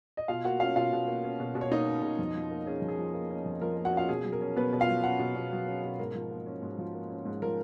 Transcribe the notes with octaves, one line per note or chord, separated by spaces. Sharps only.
D#5
B2 F4 F5
A#3 F#4 F#5
C#4 F4 F5
B2 F4 F5
B2
A#3
C#4
B2
B2
C#5
A#3 D#4 D#5
C#4
B2
F2
F3
A#3
C#4 G#4
F2
G#4
F3
A#3
C#4
F2
F3 A#4
A#3
F#4 F#5
C#4 F4 F5
B2 G#4
F#3
A#4
C#4
B2 B3 B4
B2
F4 F5
F#3
C#4 F#4 F#5
B2
B2
F#3
C#4
B2
G#2 A#4
F3
A#3
C#4
G#2
F3
A#3
C#4
G#2
F3 A#4